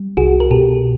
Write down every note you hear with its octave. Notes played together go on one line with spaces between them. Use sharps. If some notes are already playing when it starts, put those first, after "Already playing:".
Already playing: G3
C2 F#4 G#4
A#4
B2 G4 A4